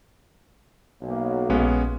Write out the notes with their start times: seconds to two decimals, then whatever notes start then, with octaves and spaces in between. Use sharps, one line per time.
1.02 B1 A#3
1.50 A#1 G#3 B3 C#4